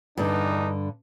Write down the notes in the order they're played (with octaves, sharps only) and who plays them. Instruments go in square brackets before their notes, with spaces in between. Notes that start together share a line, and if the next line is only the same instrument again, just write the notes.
[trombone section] E2 D4 D#4 [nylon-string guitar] G2 D3